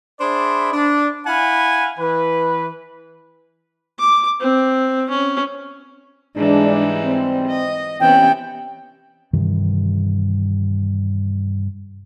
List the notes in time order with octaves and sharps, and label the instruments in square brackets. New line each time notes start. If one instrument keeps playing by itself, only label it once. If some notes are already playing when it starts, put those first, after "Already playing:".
[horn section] D4 G#4 C5 D5 E5 B5
D4
E4 F5 F#5 G#5 B5
E3 B4
[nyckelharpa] D6
C4
C#4
[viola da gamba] G#2 E3 G3 [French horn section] G#3 D4
[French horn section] C4
[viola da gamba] D#5
[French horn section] C3 C#4 [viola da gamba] E3 B3 [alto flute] G5
[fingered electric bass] G2 C3 D#3 E3